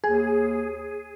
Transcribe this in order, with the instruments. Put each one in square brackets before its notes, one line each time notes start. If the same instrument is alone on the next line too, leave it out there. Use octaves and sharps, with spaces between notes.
[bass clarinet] D#2 [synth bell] G#4